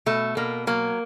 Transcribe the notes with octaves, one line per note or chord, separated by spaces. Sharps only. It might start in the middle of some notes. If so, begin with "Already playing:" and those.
B2 A3
B2 A#3
F#3 A#3